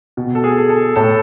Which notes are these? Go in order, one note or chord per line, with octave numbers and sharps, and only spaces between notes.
B2
A4
G#4
A4
A2 A4